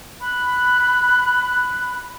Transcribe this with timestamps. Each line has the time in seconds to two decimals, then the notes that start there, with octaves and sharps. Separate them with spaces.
0.21 B5 F#6